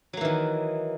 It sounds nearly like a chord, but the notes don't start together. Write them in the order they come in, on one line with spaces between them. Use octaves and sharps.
F#3 A#3 E3 D#3